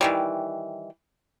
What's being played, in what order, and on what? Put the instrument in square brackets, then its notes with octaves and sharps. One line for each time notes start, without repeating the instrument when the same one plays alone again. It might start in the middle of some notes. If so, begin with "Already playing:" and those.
[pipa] D#3 E3 G3